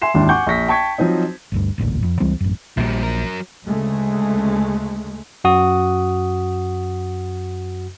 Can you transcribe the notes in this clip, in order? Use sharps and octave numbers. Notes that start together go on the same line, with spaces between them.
E5 G#5 C6 C7 E7
G#1 D#2 D4 E4 C6
F#5 G#5 C#6 D6 G6
A#1 C#6 A#6 B6
G5 A5 C#6 G#6 B6
F3 F#3 C4 D#4
G1 D2 G2
E1 A1 D2 A#2
F2
C#2 E3 G3 C4
A1 F#2
A#1 A#2 F3 G3
F#3 A#4
D2 C#3 G#3 A3
F#2 F#4 D#6